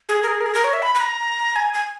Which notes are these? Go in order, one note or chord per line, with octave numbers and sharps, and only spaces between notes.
G#4
A#4
G#4
A#4
G#4
A#4
C#5
E5
B5
B5
A#5
G#5
G#5